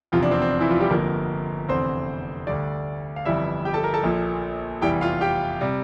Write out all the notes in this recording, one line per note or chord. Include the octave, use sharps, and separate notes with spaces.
F1 E2 C3 F3 F4
D4
C4
C4
D4
E3 E4
F3 F4
G3 G4
G1 F2 D3 F3 A#3 A#4
F1 E2 D3 C4 C5
D2 D3 G3 D4 D5
F5
G1 F2 E3 G3 E4 E5
G4 G5
A4 A5
A#4 A#5
A4 A5
A#1 A#2 F3
F1 E2 E3 G3 G4 G5
F4 F5
G4 G5
C3 G3